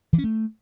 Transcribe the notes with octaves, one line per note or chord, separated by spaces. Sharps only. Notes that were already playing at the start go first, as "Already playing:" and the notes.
E3
C#4
A3